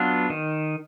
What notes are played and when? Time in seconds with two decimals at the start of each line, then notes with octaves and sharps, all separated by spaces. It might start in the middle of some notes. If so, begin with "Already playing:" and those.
Already playing: F#3 B3 D4 F4
0.30 D#3